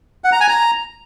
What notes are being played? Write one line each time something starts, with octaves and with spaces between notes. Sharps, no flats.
F#5
A#5
G#5
A#5